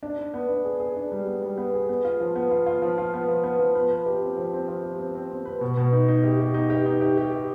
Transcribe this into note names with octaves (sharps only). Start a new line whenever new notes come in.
D4
D4
B3
D4
G#4
G#4
D4
G3
B3
G3
B3
G#4
B3
F4
F3
B3
F4
F4
F3
F4
B3
F3
B3
F3
B4
B4
G4
C4
F3
C4
F3
G4
C4
C4
C4
B4
B2
B2
D#4
D#4
G4
G4
D#4
G4
D#4
G4
G4
G4